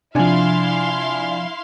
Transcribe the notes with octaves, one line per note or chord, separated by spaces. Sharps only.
C3 F3 D4 E4 F5 G#5 C6